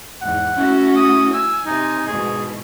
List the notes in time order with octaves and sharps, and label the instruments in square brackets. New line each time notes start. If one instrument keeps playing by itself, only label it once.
[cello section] E2 G#2 [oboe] F#5
[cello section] A3 E4 F#4 [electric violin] C#4
[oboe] D#6
[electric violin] G#5 [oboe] E6
[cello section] C3 [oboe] D#4
[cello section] G#2 B2 E3 [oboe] G#4